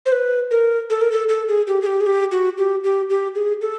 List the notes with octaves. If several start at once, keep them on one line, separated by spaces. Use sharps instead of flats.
C5
B4
A#4
A4
A#4
A4
A4
G#4
G4
G#4
G4
G#4
G4
F#4
G4
G4
G4
G#4
A4